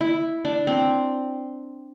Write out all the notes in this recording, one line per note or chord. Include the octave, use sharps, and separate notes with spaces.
E4
D4
C4